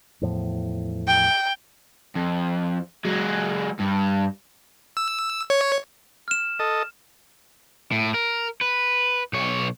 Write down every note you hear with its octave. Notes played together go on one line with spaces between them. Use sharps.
E2 A2 F3
G5
F2
F#3 G#3
G2
E6
C#5
F6 E7
A4 D#5
A2
A#4
B4
B1 C#5